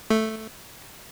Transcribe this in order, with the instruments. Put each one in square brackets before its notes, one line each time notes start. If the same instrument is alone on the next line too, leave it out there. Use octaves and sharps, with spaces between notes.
[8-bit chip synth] A3